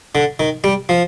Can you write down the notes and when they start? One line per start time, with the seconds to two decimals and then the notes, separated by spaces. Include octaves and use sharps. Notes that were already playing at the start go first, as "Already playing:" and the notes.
0.15 D3
0.40 D#3
0.64 G3
0.89 F3